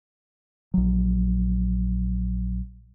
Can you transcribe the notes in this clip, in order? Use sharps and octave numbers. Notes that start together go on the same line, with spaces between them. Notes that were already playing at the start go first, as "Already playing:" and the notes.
A#1 F#3